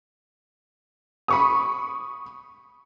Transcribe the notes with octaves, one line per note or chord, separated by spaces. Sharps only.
B5 C#6 D#6